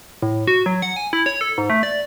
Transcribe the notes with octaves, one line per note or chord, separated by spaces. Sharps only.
A2
F#4
F#3
F#5
G#5
E4
C#5
A4
G#2
A3
D5